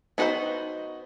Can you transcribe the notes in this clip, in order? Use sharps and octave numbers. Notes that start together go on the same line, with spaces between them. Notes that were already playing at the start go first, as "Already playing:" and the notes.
B3 D#4 F#4 A4 C5